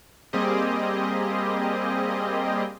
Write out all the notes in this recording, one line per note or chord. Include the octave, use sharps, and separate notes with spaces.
G3 A#3 C4 G4 G#4 D#5